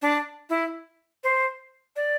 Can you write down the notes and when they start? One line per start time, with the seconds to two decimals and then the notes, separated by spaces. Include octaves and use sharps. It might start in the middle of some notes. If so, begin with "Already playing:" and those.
0.02 D4
0.50 E4
1.24 C5
1.96 D5